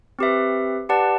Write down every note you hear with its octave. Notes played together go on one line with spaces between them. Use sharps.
C4 G4 B4 E5
G4 B4 D5 F#5 A5